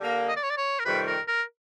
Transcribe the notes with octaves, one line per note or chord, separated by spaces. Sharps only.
D3 G3 A#3
D#5
D5
C#5
D5
C#5
A#4
F2 C3 D#3 G3 B4
A#4
A#4